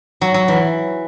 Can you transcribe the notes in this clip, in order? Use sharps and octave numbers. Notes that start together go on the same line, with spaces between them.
F#3
F#3
E3